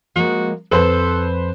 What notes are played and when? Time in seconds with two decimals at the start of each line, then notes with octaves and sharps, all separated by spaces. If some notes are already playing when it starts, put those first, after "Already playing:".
0.15 F3 G#3 A#3 F#4
0.71 F2 A4 B4 C5